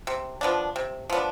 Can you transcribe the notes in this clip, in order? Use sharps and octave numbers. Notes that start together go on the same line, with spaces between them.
C3
F3 B3 D4
C3
F3 B3 D4